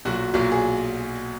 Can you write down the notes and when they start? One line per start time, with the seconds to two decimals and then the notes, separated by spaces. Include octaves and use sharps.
0.05 B1 A#2 F#3 F#4
0.34 B1 A#2 F#3
0.52 G#4